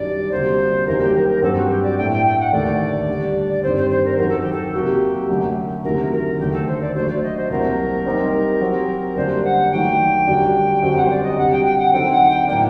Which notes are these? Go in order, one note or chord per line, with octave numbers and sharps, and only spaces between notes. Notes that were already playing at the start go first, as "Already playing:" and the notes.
Already playing: F#2 D#3 G3 D4 D5
D2 C3 G3 A#3 C5
F#2 D#3 G3 A#3 A#4
G4
A#4
A#4
G2 F#3 C4 G4 A4
F#4
G4
D5
A2 A3 D4 G5
G5
G5
F#5
D#2 D3 A3 D4 D5
D3 G3 D4
D5
G2 D#3 G3 C4 C5
C5
C5
A#4
F#2 D#3 F#3 A#4
A4
G4
A4
C3 F#3 A#3 F#4 G4 A#4
F#2 D3 F#3 A3
D2 C3 D#3 F#3 A3 A#4
A#4
D#2 D3 A3 G4
A4
C5
D5
F#3 A3 D4 F#4 C5
D5
D#5
C5
C2 C3 F#3 A#3 A#4
G3 C4 D#4 G4
F#3 C4 G4
F#2 D3 G3 A#3 D4 C5
F#5
D#3 F#3 A3 D4 G5
F#2 D3 G3 D4 F#4
F#2 D3 G3 C4 F#4 G5
F#5
C5
D5
D#5
D2 C3 G3 F#5
G5
G5
F#5
D3 F#3 C4 D#4 A4 G5
F#5
G5
A2 F#3 A#3 D4 G5